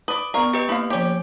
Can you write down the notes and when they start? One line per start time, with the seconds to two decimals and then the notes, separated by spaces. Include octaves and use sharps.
0.08 B4 D5 D#6
0.34 B3 A#4 D5 F5 A#5 C#6
0.54 G4 B4 D#5 G5
0.69 A#3 E4 F5
0.90 F3 C#4 G4 C#5 D5